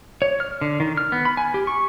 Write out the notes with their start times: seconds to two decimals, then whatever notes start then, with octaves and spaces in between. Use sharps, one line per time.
0.22 C#5
0.40 F6
0.61 D3
0.80 D#3
0.97 F6
1.12 B3
1.25 B5
1.37 G#5
1.54 G4
1.67 C#6